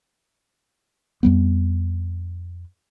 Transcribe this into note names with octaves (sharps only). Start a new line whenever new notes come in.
F2 G3 B3